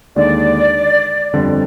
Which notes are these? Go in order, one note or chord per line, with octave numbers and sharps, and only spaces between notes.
D#2 D3 G#3 D#4 D5
G1 F2 D3 G3 C4